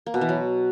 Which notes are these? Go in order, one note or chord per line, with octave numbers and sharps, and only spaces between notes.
A#3
B2
E3
F#3